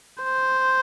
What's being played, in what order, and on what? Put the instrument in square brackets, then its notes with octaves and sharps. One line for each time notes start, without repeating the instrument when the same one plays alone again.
[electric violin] C5